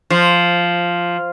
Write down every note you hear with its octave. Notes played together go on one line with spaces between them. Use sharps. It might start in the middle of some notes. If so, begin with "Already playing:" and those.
F3